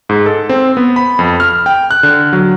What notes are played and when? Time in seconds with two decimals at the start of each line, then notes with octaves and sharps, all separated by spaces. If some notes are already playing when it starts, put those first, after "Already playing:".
0.09 G#2
0.26 A4
0.49 C4
0.77 B3
0.96 B5
1.19 F2
1.40 F6
1.66 G5
1.91 F#6
2.03 D3
2.33 F#3